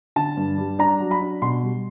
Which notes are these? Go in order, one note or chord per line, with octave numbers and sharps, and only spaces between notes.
D3 A5
G2
G3
D4 A#5
F#3
B5
D4
B2 C6
G3